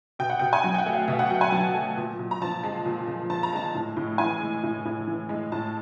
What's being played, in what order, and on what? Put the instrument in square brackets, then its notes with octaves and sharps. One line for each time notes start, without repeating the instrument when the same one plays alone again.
[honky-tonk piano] B2 G5
F#5
B2 G5
G#5
F#3 G5
G5
F#5
A3
F5
B2 E5
F#5
B2 G5
G#5
F#3 A5
A3
A#2
A#2
A#5
F3 A5
G#3
A#2
A#2
F3 A5
A#5
G#3 A5
A2
A2
E3 G#5
G#3
A2
A2
E3
G#3
A2 A5